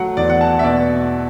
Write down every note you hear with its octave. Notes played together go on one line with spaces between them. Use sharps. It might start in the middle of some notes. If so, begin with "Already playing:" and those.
Already playing: F#3 A3 F#5
E2 D5
F#5
A5
E5
B2 D5